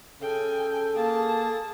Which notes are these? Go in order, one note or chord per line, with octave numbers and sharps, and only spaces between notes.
C#3 A4 G5 G#5
A#3 G#4 A5